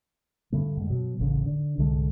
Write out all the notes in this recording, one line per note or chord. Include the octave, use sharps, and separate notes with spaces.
G2 D3 A3
F#2 G#3
B2 F#3
E1 A1 A2 C#3
D3
C2 G#2 D3 G#3